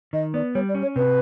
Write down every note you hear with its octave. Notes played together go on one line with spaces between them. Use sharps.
D#3 D#5
B3 D5
G3 C#5
D5
C#4
C#5
C3 B4